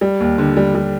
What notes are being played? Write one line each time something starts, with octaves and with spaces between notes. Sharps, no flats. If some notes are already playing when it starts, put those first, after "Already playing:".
G3
D#2
D3
G3
G3